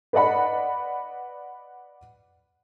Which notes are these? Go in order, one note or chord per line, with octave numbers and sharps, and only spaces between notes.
B4 D5 D#5 F#5 B5